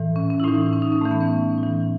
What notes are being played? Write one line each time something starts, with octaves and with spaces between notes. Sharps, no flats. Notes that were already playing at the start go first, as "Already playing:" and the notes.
Already playing: A2 E3
C#4
C#4
E4
A2 E3 D#4
C#4
D#4
C#4
A2 E3 A3
B3
C#4
A2 E3